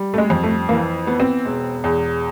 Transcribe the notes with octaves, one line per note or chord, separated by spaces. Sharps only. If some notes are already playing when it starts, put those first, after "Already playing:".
Already playing: G3
A3
G#3
F2
A3
E3 A#3
B3
C4
E1
E2